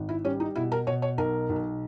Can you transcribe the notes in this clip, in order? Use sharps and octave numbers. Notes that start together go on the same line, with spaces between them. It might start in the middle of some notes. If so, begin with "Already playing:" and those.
Already playing: G#1
E4
G3 C#4
D#4
B2 E4
A#4
B2 C#5
C#5
B1 A#4
B1